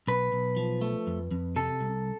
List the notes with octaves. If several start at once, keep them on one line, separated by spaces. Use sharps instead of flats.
B1 B4
B1
F3
A3
F2
F2
C3 A4
C2